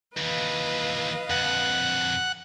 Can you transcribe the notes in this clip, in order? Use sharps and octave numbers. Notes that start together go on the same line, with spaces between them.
D#2 E3 B4 D#5 F5
F2 D3 F#5